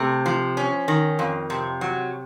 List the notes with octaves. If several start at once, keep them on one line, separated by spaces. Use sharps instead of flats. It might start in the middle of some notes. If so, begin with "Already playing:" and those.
Already playing: C3 A3
F3
C#4
D#3
F2
C3
F#3